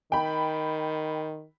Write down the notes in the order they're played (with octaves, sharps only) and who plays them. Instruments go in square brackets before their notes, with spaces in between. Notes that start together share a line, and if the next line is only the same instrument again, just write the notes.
[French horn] D#3 [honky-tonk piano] G5 B5